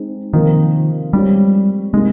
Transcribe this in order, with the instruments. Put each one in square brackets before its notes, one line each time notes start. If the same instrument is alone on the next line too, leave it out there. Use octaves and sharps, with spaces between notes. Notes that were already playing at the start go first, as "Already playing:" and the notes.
Already playing: [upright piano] G#3 C4 D#4
[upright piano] C3 F3 A#3 F4 A#4 [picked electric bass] D#3
[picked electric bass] G3 [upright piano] G#3 C4 G4 C#5
[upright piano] C3 G3 A#3 D#4 G#4 [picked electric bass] G#3